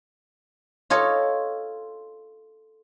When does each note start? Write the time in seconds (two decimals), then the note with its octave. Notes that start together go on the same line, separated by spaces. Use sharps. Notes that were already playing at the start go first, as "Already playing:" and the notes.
0.90 F4 A4 C#5 D#5